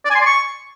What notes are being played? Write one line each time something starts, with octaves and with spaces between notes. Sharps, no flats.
D5
G#5
C6
D5
C#6